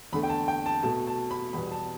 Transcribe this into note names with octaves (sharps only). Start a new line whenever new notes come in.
E2 D3 A3 B5
G5
A5
G5
A5
B2 A3 A5
A5
B5
E2 B2 G3 B3 B5
A5